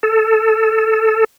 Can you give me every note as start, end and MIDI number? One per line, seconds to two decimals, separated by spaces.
0.03 1.24 69